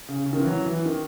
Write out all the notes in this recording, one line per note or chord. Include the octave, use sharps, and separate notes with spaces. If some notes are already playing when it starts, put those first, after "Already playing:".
C#3
C#3
D#3
E3
F#3
E3
D#3